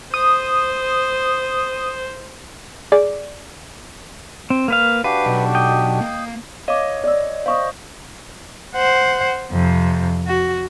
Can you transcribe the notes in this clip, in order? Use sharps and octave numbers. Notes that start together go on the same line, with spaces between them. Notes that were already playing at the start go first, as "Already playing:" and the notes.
C5 D#6
G#4 D5
C4
A#3 B4 F5
D4 F#4 G4 B4 F5
B1
D#5 G5
A#3
C#5 D#5 F5 D6
D5 E6
C5 D#5 F5 C#6 D#6
C5 F#5
F2 C3
F#4